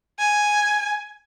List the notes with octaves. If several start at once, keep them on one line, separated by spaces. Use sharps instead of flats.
G#5